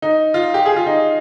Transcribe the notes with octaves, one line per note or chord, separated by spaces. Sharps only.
D#4
F4
G4
G#4
F4
D#4